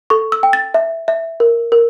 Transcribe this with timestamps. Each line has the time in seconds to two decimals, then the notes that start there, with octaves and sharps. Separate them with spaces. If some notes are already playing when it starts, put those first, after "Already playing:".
0.10 A4 C#6
0.32 E6
0.43 G5
0.53 A6
0.74 E5
1.08 E5
1.40 A#4
1.72 A#4